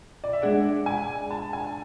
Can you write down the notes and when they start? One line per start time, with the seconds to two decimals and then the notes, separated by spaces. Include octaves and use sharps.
0.24 D5
0.33 E5
0.42 G#3 D4 G#4 D5 F#5
0.86 G#5
1.31 A5
1.53 G#5